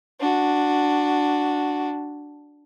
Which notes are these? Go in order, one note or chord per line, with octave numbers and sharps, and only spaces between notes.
D4 F#4